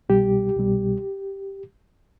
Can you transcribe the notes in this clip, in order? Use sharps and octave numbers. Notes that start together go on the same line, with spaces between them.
C2 B2 G3 G4
C2 B2 G3